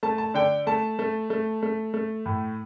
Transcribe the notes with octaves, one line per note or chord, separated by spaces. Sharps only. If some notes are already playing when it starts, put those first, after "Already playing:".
A3 A5
A5
D3 G5
A3 A5
A3
A3
A3
A3
A2